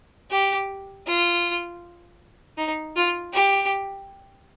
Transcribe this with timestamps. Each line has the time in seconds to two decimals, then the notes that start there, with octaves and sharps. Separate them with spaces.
0.31 G4
1.07 F4
2.58 D#4
2.96 F4
3.33 G4